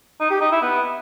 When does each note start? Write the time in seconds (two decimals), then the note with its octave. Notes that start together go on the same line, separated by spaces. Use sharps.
0.20 D#4
0.30 G4
0.41 D#4
0.51 E4
0.62 B3